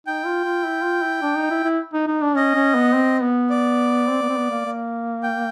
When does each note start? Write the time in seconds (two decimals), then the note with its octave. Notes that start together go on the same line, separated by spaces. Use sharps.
0.07 D#4 G5
0.25 F4
0.44 F4
0.64 E4
0.83 F4
1.02 E4
1.22 D4
1.36 D#4
1.50 E4
1.64 E4
1.93 D#4
2.07 D#4
2.22 D4
2.35 C#4 D#5
2.55 C#4
2.75 B3
2.94 C4
3.22 B3
3.50 D5
4.08 C4
4.22 B3
4.29 C4
4.37 B3
4.50 A#3
4.65 A#3
5.23 G5